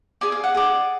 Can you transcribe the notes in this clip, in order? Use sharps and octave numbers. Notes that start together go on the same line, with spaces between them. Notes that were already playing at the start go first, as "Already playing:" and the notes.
G#4 D5 G#5
F5
F#5
G#4 D5